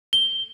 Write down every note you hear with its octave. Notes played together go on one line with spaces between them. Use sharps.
G7